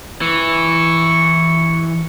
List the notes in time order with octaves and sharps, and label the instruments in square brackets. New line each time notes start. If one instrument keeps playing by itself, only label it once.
[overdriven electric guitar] E3 [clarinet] C#6